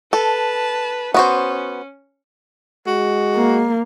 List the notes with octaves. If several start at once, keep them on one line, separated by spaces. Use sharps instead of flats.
A4 B4 A5
B3 C#4 F#4 C5
G#3 F#4
A#3